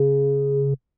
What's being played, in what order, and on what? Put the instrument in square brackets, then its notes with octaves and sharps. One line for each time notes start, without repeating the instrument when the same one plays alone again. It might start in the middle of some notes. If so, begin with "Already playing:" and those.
Already playing: [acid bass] C#3